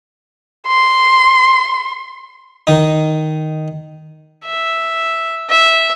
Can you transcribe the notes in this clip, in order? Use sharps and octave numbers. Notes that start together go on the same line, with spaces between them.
C6
D#3 D#4
E5
E5